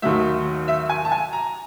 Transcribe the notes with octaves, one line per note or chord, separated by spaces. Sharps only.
D#2 D#3 F#3 A3 E5
E5
G#5
A5
G#5
A#5